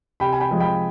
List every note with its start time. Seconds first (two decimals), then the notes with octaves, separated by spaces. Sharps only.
0.20 C3 G5 B5
0.33 G#5
0.40 G5 B5
0.51 F3 G#3
0.60 G5 B5